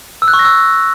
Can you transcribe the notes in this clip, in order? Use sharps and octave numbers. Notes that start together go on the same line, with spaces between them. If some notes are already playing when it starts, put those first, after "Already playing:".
E6
F#6
C#6
A#6
E6